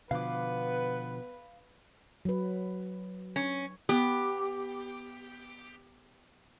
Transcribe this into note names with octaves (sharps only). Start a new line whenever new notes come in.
B2 D3 F3 B3 B4 F5 D6
F#3 B4
C#4
B3 G4